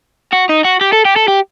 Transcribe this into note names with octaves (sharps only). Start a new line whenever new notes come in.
F#4
D#4
F#4
G4
A4
G4
A4
G4